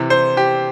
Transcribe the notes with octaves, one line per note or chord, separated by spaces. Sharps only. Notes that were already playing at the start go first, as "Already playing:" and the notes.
Already playing: C3 E3
C5
G4